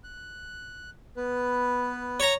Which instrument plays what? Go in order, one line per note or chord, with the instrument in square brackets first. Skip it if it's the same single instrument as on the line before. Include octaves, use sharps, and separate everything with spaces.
[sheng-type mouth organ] F#6
B3 B4
[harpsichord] C#5 A#5 [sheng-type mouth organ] C#6